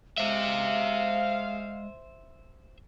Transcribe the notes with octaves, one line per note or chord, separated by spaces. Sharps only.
G#3 C5 E5 F5